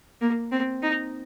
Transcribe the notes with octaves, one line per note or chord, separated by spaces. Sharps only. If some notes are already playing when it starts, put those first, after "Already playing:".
A#3
C4
D#4